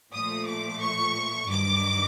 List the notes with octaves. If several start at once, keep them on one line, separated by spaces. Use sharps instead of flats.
A#2 F3 A3 D#6
D6
C#6
G2 D#3 F#3 D6